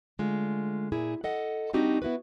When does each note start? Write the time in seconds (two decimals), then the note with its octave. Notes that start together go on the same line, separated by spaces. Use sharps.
0.19 D3 G#3 A3 F4
0.92 A#2 E4 G#4
1.24 A4 D#5 F#5
1.73 G3 C4 D4 D#4 F#4 G4
2.02 B3 E4 F#4 B4